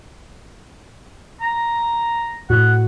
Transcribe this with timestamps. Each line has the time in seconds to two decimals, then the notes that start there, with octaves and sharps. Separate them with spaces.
1.41 A#5
2.50 A2 F#4 F#5